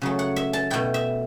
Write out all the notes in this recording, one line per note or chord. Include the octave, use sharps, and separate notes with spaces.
C#3 F#3 A3
F#5
E5
A5
B2 A3 E4 G5
E5